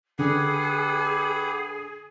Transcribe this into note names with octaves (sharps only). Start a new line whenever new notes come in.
D3 G4 G#4 B4 F#5